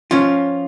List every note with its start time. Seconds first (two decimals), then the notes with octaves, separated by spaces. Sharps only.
0.11 F3 C#4 F4